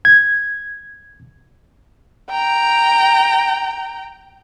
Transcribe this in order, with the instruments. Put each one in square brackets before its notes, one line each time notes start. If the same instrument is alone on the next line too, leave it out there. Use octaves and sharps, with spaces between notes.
[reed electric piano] G#6
[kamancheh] G5 A#5